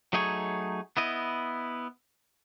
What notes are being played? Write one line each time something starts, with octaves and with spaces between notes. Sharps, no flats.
F#3 A3 D#4 G#4 C#5
B3 E4 D#5